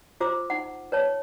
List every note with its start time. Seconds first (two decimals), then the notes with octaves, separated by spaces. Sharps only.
0.21 F4 C5 A#5 D6 E6
0.50 D#4 F#5
0.92 B4 C#5 A5